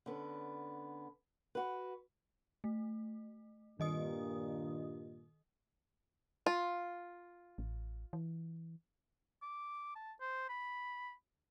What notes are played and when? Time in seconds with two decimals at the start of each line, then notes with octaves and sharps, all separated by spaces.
0.06 D3 B3 C#4
1.55 F#4 B4
2.64 A3
3.80 G2 A#2 D#3 D#5 D#6
6.46 F4
7.58 A1
8.13 E3
9.42 D6
9.95 A5
10.21 C5
10.49 B5